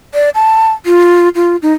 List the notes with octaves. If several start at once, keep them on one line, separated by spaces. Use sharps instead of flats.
D5
A5
F4
F4
D#4